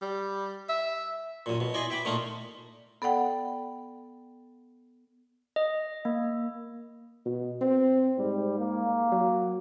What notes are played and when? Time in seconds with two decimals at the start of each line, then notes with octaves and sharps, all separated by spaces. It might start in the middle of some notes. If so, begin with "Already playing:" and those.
0.02 G3
0.69 E5
1.46 F#2 A#2
1.60 B2
1.74 E4 D5 D#5 G#5 C6
1.90 E5 G5 B5 D6
2.05 A#2 A3 A#3 D#4 F4
3.02 B3 A4 D5 F#5 G5
5.56 D#5
6.05 A#3
7.26 B2
7.61 C4
8.18 G#2 G3
8.58 A#3
9.12 F#3